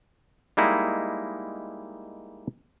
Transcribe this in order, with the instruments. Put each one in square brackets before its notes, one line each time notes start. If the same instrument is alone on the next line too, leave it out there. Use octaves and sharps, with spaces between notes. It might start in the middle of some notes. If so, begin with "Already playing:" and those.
[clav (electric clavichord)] G3 G#3 A#3 D#4 E4